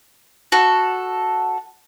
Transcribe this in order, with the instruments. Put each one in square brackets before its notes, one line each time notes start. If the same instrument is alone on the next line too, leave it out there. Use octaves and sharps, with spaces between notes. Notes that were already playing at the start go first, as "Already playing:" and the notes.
[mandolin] F#4 A4